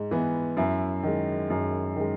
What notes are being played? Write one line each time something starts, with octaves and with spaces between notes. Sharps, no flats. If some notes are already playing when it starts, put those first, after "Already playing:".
Already playing: G#2
E3 B3
F#2 E4
D#3 G#3
F#2
D#3 G#3